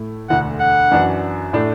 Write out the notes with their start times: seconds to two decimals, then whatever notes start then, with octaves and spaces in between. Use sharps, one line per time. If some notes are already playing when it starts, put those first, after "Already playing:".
Already playing: A2 A3 E4
0.29 E1 D2 D3 A3 F#5
0.60 F#5
0.91 F#2 E3 D4 F#4
1.53 A2 A3 D4